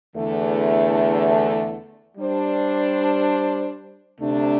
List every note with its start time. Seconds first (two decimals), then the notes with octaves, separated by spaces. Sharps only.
0.15 E2 D3 A3
2.17 G3 D4 C5
4.21 D2 C3 A3 D4